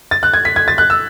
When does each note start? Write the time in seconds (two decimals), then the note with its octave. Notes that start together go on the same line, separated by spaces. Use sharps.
0.11 A6
0.23 F#6
0.34 G#6
0.45 B6
0.56 G#6
0.68 A6
0.78 F#6
0.90 E6